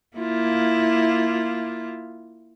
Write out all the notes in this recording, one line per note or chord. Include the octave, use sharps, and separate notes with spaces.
A#3 E4 F4